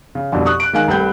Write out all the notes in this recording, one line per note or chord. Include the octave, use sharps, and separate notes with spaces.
C#3
C2 F2 B2 D3
C#6 D#6 F#6
F#6 D7
D#3 G#3 F5 G#5 F#6
C2 A3 B4 G5 G6